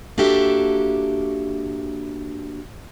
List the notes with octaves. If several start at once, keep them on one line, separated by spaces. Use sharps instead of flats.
A#3 D4 F#4 G4 A4 E5